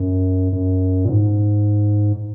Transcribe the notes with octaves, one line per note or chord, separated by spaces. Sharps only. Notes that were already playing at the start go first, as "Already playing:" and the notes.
Already playing: F#2
F#2
A#2
G#2